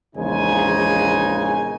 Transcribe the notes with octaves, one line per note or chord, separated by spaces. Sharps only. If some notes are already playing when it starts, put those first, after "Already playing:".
A#1 E2 C#3 G#3 D#4 G#5